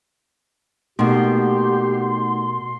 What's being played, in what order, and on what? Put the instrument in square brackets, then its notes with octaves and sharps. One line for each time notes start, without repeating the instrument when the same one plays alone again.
[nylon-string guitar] B2 A#3 [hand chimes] A3 D#4 F#5 [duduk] G4 [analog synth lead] C6